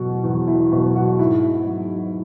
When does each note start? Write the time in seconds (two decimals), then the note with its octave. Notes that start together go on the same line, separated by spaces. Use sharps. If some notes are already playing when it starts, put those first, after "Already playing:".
Already playing: E2 B2 F#3 F#4
0.24 E2
0.47 E4
0.72 B2 F#3
0.96 F#4
1.18 G#2 E4
1.67 F#3